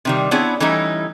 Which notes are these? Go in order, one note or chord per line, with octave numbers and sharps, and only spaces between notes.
C3 D#3 G3
B3 C4 D4 E4 G#4 C#5
E3 G3 A3 C#4 D#4 E4